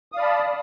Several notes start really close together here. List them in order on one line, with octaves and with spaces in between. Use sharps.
D#6 F5 D5 B5 A5